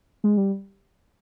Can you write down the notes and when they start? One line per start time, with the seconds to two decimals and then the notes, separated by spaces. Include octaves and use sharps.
0.24 G#3
0.37 G3